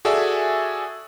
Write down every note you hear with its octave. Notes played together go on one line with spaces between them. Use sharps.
F#4 G#4 A4 D5 E5 G#5